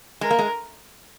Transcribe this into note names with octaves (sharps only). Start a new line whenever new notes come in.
G#3 A#4
A#3
G#3